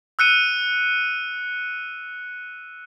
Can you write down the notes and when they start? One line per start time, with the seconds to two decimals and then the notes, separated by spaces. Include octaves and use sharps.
0.19 E6 F#6 C#7 D#7